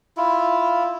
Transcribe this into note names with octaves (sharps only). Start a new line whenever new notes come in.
E4 F4